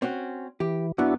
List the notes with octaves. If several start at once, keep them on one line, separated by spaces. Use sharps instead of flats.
C4 C#4 F#4
E3 G4
F#2 B3 D4 E4 F#4